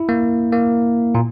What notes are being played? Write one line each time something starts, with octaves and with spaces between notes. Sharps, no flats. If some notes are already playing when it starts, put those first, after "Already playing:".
Already playing: E4
A#3
A#3
A#2